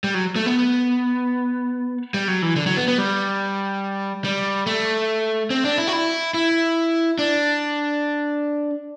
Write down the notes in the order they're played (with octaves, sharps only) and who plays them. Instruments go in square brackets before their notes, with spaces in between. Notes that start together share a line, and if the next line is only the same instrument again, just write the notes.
[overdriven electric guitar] G3
F#3
A3
B3
G3
F#3
E3
D3
F#3
B3
B3
G3
G3
A3
C4
D4
E4
F#4
E4
E4
D4